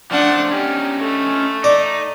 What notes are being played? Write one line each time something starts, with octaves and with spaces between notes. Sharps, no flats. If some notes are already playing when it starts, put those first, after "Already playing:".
F3 A3 D4 F#5
C#4 D#4 G4
A3
D#4 D5